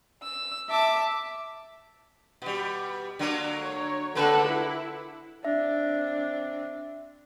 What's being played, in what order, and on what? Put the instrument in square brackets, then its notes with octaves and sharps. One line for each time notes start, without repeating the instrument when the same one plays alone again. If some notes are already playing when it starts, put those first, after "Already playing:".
[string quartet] E6
E5 A5 D6
[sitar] B2 G3
D3 F#3 A#3
[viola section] C#5
[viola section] D3 A4 F#5 [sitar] A#3 C4 B4
[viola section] E4
[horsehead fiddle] C4 D4 [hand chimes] E5